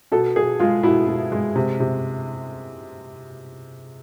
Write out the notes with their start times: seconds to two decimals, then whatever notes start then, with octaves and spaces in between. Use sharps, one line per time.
0.12 B2 A4
0.36 B2 G#4
0.60 G#3 F4
0.83 B2 E4
1.08 B2
1.32 G#3
1.56 C3
1.80 C3